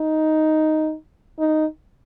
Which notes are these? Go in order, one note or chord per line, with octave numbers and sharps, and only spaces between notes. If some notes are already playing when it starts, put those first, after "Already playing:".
Already playing: D#4
D#4